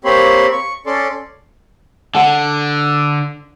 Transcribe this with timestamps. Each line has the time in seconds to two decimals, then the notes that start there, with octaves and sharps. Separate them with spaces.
0.05 A#3 C4 G4 C#5 B5 C6
0.52 C#6
0.86 C#4 A4 D5 C6
2.15 D3 D4 F#5 A5